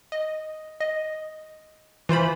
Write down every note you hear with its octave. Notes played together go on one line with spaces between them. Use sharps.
D#5
D#5
E3 F4 C5 B5